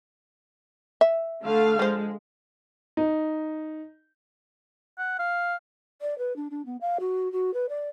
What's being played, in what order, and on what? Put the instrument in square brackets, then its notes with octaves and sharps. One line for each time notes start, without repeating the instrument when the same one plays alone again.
[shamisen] E5
[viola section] D3 A3 F5
[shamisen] F3 C5 [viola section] G#3
[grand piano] D#4
[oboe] F#5
F5
[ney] D5
B4
D4
D4
B3
F5
F#4
F#4
B4
D5